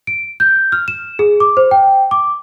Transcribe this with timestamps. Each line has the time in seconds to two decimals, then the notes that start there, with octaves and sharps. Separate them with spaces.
0.07 D7
0.40 G6
0.72 F6
0.88 E7
1.19 G#4
1.40 D6
1.57 C5
1.71 G5
2.11 D6